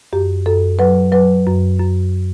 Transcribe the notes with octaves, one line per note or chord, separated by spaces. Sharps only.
F#2 G4
F#2 A4
F#3 B4
F#3 B4
F#2
F#2